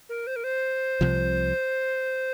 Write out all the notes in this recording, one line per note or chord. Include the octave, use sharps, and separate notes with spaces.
A#4
C5
A#4
C5
C2 C3 F3